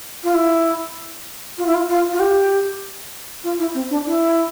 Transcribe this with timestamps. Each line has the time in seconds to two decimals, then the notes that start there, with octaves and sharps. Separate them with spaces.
0.24 F4
0.34 E4
1.58 F4
1.67 E4
1.74 F4
1.89 F4
2.12 F4
2.20 G4
3.44 F4
3.59 E4
3.74 C4
3.90 D4
4.06 E4